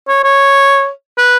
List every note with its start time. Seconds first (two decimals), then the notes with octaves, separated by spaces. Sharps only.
0.08 C#5
0.24 C#5
1.18 B4